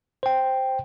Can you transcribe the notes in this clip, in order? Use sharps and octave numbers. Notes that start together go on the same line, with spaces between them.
C5 G5